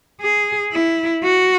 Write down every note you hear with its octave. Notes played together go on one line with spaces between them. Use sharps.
G#4
E4
F#4